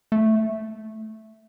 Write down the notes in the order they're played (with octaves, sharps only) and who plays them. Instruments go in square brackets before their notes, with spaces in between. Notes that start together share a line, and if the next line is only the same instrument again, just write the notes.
[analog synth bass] A3